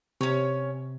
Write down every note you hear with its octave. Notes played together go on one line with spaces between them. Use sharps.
C3 C#4 C#5